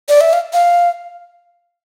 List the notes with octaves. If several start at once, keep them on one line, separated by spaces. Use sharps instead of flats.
D5
E5
F5
F5